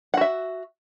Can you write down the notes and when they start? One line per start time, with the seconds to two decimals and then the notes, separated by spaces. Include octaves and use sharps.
0.14 F#5
0.17 F#4
0.21 E5